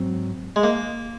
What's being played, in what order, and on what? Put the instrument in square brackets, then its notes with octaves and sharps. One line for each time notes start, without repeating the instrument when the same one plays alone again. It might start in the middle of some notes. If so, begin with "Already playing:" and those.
Already playing: [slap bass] G#2 F#3 C4
[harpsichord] G#3
A#3